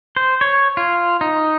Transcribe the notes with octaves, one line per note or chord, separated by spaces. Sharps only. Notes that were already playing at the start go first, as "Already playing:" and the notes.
C5
C#5
F4
D#4